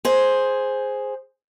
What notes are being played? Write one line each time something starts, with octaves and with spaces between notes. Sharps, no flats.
G#4 C5